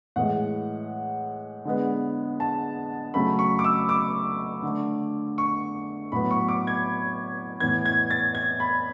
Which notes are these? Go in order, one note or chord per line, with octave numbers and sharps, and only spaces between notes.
A2 E3 G#3 F#5
D3 G#3 B3
A5
C#3 F#3 A3 B5
C#6
D6
E6
D6
D3 A3
C#6
A2 F#3 B3 B5
C#6
D6
G#6
A2 E3 B3 G#6
G#6
A6
G#6
B5